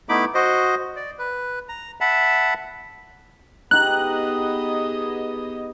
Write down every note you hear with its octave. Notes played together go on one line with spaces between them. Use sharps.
A3 B3 D#4 E4 B5 D6
F#4 C5 D#5
D5
B4
A#5
E5 F#5 A5 B5
B3 D#4 G4 G#4 D#5 A#5 F#6